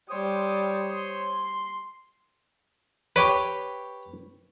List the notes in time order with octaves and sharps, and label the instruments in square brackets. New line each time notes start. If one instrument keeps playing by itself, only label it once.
[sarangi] G3 [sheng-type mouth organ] C5 C#5 [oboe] D#6
[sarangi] C6
[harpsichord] G4 C#5 D6 [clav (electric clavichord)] B4